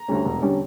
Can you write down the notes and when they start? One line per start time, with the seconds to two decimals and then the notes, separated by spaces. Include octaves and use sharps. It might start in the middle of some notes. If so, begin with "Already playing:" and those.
Already playing: A#5
0.08 D2 D3 G3 C#4
0.25 E1
0.42 D3 G3 C#4